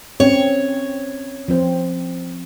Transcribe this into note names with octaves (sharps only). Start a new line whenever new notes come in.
C4 C#4 C#5
F3 C4 C5